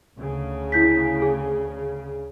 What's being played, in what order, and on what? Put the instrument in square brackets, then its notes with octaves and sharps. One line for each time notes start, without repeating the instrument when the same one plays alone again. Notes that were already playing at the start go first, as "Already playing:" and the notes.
[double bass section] D2 C#3
[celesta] E4 G6 B6
G#4